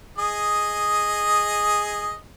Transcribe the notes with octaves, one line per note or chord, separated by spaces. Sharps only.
G#4 D#5